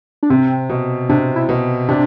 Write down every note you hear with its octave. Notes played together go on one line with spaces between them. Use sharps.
D4
C3 C4
B2
C3 D4
E4
B2
C3 D4